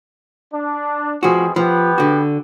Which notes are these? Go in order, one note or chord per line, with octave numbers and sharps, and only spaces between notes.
D4
B2 F3 C4 F#4 G#4
F3 B3 G4 B4
D3 F#4